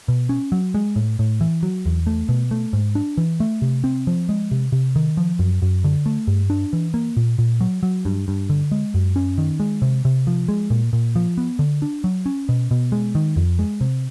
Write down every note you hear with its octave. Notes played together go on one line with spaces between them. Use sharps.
B2
C#4
F#3
G#3
A2
A2
E3
F#3
E2
A3
B2
A3
G#2
D4
E3
A3
C3
C4
F3
G#3
C3
C3
D#3
F3
F#2
F#2
D3
A3
G2
D4
E3
A#3
A#2
A#2
F#3
F#3
G2
G2
D3
G#3
F#2
C#4
D#3
G#3
C3
C3
F3
G#3
A#2
A#2
F3
B3
D3
D4
F#3
C#4
B2
B2
G#3
D#3
F2
G#3
C3